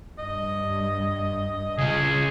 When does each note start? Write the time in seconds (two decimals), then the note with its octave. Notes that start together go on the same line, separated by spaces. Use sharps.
0.19 G2 D#5
1.78 C#3 G#4 D#5